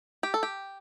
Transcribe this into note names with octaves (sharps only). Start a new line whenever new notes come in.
G4
A4
G4